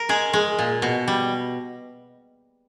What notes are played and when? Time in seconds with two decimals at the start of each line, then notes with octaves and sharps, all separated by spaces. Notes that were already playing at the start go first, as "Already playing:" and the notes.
Already playing: A#4
0.09 G#3 G#4
0.33 G#3
0.59 A#2
0.82 B2
1.08 G3